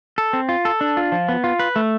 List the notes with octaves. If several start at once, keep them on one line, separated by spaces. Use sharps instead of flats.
A4
C4
F4
A4
D4
F4
F3
B3
F4
B4
A3